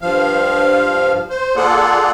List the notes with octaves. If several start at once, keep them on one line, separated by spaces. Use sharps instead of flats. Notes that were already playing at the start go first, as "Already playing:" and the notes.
G2 F3 F5
C5
A#3 F4 G#4 A4 D5 F#5